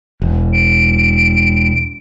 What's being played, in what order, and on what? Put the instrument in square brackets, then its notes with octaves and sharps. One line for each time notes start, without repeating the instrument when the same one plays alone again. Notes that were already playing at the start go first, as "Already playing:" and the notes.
[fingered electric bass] E1
[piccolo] D7